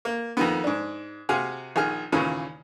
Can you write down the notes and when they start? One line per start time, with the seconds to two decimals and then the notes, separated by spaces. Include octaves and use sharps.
0.05 A#3
0.37 F2 D#3 B3
0.64 G#2 D4
1.29 C3 F#4 G#4 F5
1.76 A#1 D#3 G#4 F6
2.12 D#2 A#2 C#3 E3